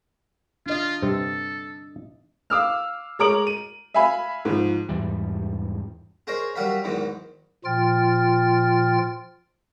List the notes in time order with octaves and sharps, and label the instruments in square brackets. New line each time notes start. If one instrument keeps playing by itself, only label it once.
[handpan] D4 D#5 [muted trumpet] F4
[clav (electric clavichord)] G2 C3 C4 [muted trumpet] A4
[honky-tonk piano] F5 D6 E6 F6
G#3 C#5 A#5 D6 D7 F#7
D#7
E5 F5 G#5 B5
G#2 F3
[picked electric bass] E2 G#2 E3 G3
[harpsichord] G#4 A#4 C5 C#5 D#5 A#5
F#3 G3 F#4 A#4 F5 B5
E2 G#2 D#3 E3 F#3
[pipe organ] A#2 F3 F4 G5 F6 A6